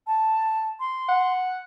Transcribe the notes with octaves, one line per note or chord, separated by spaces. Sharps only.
A5
C6
F#5